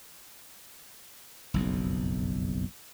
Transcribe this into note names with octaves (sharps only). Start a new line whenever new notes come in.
F#1 B1 F2